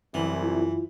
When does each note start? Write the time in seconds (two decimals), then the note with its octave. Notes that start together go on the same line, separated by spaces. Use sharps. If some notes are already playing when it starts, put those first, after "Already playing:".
0.14 C2 F#2 E3
0.43 E4 F4